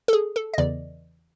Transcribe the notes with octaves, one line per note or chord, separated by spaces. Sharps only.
A4
G#4
A4
D#5
E2 C#3 E3 D5